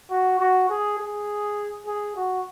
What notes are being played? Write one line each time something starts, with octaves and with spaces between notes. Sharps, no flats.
F#4
F#4
G#4
G#4
G#4
F#4